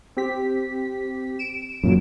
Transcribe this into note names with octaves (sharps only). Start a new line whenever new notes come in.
C4 G4 B6
D7 E7
F#2 A#2 F#3